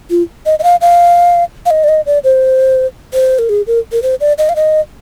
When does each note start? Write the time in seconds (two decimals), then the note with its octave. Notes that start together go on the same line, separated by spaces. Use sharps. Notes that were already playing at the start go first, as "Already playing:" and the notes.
0.10 F4
0.46 D#5
0.59 D#5
0.64 F5
0.81 F5
1.66 F5
1.71 D#5
1.84 D5
1.89 D#5
2.06 D5
2.24 C5
3.13 C5
3.39 A#4
3.49 G#4
3.67 A#4
3.92 A#4
4.03 C5
4.21 D5
4.38 D#5
4.49 F5
4.56 D#5